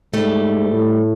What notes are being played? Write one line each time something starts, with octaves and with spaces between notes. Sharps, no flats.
G#2 G3 A3
A2